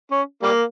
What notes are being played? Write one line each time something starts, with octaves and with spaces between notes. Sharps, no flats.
C#4
G3 A#3